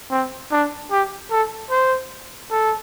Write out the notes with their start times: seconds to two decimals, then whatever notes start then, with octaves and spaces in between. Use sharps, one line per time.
0.11 C4
0.52 D4
0.91 G4
1.31 A4
1.70 C5
2.51 A4